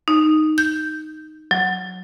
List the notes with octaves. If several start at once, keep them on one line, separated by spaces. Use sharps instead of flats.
D#4
G6
F#3